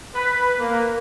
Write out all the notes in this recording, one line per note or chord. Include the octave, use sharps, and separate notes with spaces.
B4
A#3